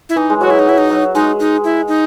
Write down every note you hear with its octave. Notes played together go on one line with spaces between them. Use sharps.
E4
E3 D#4
G#3
F#3 F#4
E4
D#4
F#3 E4
D#4
F#3
G#3 D#4
D#4
E4
D#4